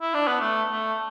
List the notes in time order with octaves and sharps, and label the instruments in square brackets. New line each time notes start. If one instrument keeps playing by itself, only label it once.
[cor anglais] E4
D4
B3
A3
A3